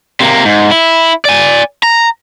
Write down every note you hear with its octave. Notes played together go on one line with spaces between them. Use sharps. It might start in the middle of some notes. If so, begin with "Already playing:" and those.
C3 A#3
G#2
E4
D5 G#5
A#5